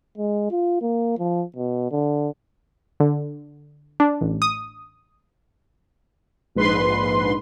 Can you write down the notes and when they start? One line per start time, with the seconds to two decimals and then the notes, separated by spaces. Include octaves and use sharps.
0.18 G#3
0.51 F4
0.82 A#3
1.19 F3
1.56 B2
1.91 D3
3.00 D3
4.00 D4
4.21 A1
4.42 D#6
6.55 A#1 G#2 B4 C6